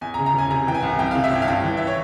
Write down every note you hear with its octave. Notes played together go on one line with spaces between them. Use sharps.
E2 G#5
A#5
C#3
A#5
E1 G#5
C3 A#5
E3 G5
G#5
C2
F2 G5
C3 F5
E5
G1 G5
F5
G2 G5
E3
E5
C#5